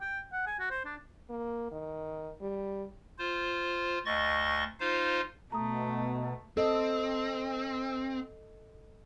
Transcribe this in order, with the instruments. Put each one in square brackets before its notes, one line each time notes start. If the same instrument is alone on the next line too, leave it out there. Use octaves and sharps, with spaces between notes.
[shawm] G5
F#5
G#5
F#4
C5
D4
[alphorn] A#3
D#3
G3
[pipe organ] F4 C5
D2 D#5 C#6 A6
D#4 F4 C5 F5
[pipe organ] B2 [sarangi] A3 [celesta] A#5 D#6
[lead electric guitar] C4 [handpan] A4 D#5